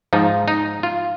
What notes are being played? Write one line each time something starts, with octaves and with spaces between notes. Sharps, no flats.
G#2 F3 D#4
D#4
F4